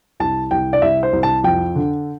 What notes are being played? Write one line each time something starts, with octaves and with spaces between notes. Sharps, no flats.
C2 A5
C2 G5
D5
C2 E5
C5
C2
A5
F2 G5
D3